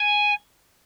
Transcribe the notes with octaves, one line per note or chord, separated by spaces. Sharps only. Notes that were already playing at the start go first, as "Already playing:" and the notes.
Already playing: G#5